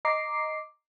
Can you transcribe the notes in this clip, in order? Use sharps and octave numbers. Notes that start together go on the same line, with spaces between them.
D#5 A#5 D6 C7